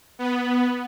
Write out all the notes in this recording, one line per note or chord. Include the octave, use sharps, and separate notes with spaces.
B3